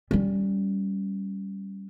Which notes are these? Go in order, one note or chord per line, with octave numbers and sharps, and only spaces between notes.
G3 C#4